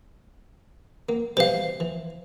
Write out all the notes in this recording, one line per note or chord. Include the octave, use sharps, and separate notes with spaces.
A#3
B2 E3 G3 C5 F5
E3